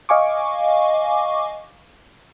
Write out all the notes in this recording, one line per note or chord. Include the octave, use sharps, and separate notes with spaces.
D#5 F5 G#5 C#6 D6